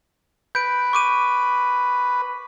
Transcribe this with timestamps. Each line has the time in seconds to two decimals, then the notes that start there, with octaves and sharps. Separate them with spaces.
0.55 B4 G6 D7
0.93 C#6 D6 D#7